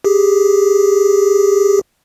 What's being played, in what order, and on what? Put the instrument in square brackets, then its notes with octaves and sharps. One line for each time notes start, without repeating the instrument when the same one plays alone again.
[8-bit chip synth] G4 G#4